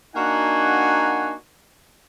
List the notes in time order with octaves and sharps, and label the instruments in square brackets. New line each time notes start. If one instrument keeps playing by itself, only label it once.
[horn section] A#3 D4 D#4 F#4 F#5 G#5